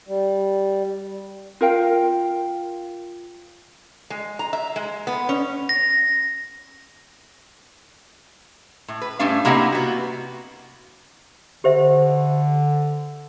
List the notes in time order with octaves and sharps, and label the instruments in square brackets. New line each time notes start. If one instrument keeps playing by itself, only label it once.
[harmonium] G3
[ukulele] F4 A#4 F5 G5
[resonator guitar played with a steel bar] G#3
A#5
E5
G#3
B3
C#4
[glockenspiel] A#6
[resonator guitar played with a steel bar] A2
B4
A2 G3 A3 C#4 D4 F5
C3 A#3 E4 G4 D#5 F#5
B3 F#4
[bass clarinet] D3 [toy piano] G4 C5 E5